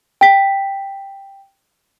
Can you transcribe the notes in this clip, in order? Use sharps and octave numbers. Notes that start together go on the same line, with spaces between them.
G5 B6